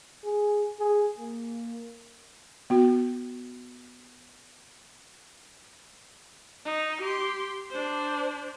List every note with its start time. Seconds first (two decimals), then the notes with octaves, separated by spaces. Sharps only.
0.24 G#4
0.79 G#4
1.18 A#3
2.70 B3 F#4
6.65 D#4
7.02 G4 C6
7.70 D4 C5